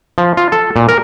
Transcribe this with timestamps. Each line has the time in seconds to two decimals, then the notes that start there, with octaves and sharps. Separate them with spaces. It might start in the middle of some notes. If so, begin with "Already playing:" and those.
0.18 F3
0.37 F4
0.52 A4
0.76 A#2
0.89 A#4